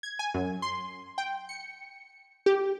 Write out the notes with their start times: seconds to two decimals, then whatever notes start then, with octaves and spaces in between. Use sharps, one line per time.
0.03 G#6
0.19 G#5
0.34 F#2
0.62 C6
1.18 G5
1.49 C#7
2.46 G4